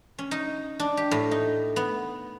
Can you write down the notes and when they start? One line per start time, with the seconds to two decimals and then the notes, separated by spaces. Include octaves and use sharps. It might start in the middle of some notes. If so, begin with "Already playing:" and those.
0.18 C#4
0.31 D#4
0.80 D4
0.97 G4
1.11 A2
1.31 D#4
1.76 B3